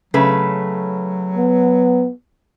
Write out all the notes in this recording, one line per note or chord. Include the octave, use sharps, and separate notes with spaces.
C#3 F#3 A3 B4
B3